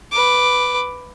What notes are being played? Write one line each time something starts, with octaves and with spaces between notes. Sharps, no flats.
B4 D6